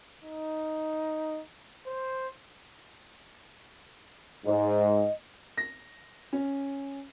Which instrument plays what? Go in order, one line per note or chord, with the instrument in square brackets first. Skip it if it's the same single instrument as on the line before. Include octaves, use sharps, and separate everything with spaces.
[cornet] D#4
C5
[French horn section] G#2 [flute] D#5
[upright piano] A#6
C#4